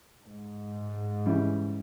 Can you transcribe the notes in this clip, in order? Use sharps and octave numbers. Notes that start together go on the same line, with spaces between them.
G#2
C#3 E3 G3